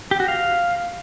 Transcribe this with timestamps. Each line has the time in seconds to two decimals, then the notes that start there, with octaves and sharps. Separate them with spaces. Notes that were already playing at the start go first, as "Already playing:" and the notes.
0.11 G4
0.20 F#4
0.28 F5